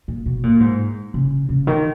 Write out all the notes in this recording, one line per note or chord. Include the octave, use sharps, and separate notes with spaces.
A#2
B2
A#2
G#2
C#3
C#3
D#3